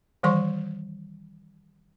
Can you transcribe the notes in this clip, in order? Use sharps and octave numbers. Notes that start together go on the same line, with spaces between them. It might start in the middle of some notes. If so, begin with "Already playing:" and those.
D#3 E3 G3 C5 C6 C#6